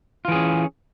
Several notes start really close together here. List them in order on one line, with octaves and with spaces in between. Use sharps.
F4 E3 G#4 C#4